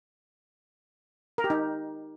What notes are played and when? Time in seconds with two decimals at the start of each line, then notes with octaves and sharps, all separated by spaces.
1.38 A#4
1.44 G4
1.50 D#4